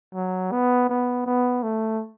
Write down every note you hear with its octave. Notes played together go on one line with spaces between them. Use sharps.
F#3
B3
B3
B3
A3